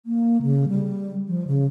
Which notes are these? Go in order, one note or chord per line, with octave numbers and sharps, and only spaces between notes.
A#3
C#3
G3
F3
C#3